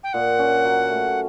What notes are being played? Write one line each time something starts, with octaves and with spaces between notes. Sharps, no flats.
G5
A#2 F#5
C#4
F#3
A3